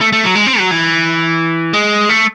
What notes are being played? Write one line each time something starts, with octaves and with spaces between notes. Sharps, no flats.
A3
A3
F#3
G#3
C4
F#3
E3
G#3
A3